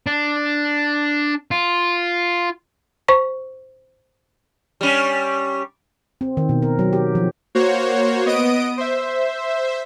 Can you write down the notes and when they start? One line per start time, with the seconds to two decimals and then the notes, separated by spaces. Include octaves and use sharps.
0.06 D4
1.51 F4
3.08 C5 C#6
4.81 G3 C#4
6.21 C4
6.37 D#3
6.49 B2
6.62 A#4
6.79 F#3
6.93 G4
7.15 F3
7.55 A#3 F#4 C5 C#5
8.26 B3 D#5 D#6 D7
8.78 C5 E5